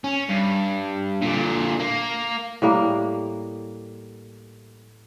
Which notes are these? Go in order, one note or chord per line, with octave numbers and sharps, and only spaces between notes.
C#4
G2
A#2 D3
A#3
A2 G3 A#3